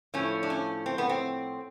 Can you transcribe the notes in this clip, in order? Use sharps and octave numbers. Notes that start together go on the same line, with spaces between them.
A2 F3 A3 C#4
D4
C#4
C4
B3
C4